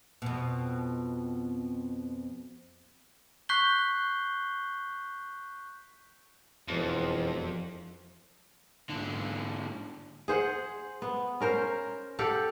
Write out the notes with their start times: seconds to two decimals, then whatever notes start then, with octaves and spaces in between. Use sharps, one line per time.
0.22 F2 B2
3.49 C#6 F#6 G6 B6 C7 G7
6.68 E1 F2
8.89 G#2 D3
10.28 G#4 C5 F#5
11.02 B3
11.40 C#4 A#4 C5
12.19 G4 A4 F5 F#5